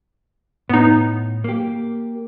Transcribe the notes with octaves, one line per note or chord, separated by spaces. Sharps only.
A2 B3 D#4
A#3 G4